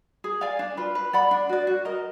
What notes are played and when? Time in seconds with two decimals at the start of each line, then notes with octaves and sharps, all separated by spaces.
0.24 G#4
0.41 D5 F5 G#5
0.59 D4
0.77 F4 B4
0.95 B4
1.13 D5 F#5 B5
1.31 D4
1.49 F#4 D5
1.67 F#4
1.85 A#4 D#5